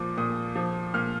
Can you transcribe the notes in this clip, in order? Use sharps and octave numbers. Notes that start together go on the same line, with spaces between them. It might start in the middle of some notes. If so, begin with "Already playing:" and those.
Already playing: A#2 F3 D6
A#2 D#6
F3
A#2 F6